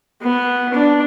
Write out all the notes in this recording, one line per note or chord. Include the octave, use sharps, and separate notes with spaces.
B3
D4